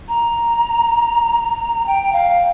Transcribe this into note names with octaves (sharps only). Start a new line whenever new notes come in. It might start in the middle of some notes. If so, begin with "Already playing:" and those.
A#5
G5
F5